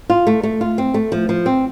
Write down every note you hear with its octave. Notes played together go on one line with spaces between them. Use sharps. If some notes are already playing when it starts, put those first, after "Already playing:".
F4
A3
A3
F4
C4
A3
F3
F3
C4